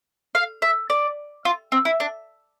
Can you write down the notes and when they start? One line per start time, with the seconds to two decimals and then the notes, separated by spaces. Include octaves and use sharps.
0.35 F5
0.62 E5
0.90 D5
1.45 F4
1.72 C4
1.85 E4
2.00 D4